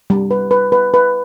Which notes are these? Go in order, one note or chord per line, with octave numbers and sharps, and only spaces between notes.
G3
B4
B4
B4
B4